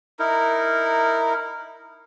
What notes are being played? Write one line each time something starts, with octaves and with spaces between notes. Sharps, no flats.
D#4 E4 A#4